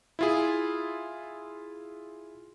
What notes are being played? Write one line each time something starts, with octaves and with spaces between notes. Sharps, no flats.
E4 F4 G#4